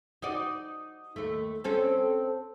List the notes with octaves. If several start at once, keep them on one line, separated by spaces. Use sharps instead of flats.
D#4 F#4 D5
D#2 A3
C4 C#4 A4